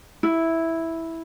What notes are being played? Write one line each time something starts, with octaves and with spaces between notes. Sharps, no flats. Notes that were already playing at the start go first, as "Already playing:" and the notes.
E4